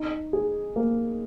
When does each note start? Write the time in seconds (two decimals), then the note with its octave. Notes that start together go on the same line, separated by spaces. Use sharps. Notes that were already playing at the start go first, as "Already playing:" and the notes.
Already playing: D#4
0.33 G#4
0.76 A#3